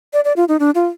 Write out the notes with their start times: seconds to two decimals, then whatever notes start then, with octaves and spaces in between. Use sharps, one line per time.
0.13 D5
0.25 D5
0.36 F4
0.48 D#4
0.60 D4
0.75 F4